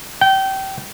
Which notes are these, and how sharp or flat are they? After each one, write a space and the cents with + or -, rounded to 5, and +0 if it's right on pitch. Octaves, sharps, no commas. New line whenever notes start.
G5 -25